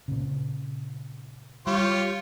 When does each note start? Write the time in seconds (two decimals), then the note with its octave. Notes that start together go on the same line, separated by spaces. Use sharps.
0.08 A#2 C#3
1.67 G3 F4 G4 C#5